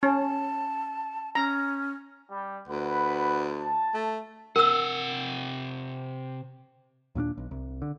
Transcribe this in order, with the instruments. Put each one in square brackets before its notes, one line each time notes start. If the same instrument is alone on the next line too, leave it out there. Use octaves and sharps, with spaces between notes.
[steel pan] C#4 [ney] A5
[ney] C#4 [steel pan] A#5
[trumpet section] G3
[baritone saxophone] D2 [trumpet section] B4 F#5 B5
[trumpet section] A5
[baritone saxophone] A3
[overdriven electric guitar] C3 F#5 [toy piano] A#4 E6
[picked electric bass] D#2 A#2 C#4 D4
B1
C2
D3